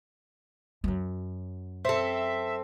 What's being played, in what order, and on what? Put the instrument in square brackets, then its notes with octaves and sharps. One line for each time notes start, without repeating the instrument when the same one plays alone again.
[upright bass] F#2 F#3
[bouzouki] C4 A4 [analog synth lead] E5